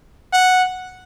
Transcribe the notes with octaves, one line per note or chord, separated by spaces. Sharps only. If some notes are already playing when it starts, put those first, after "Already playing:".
F#5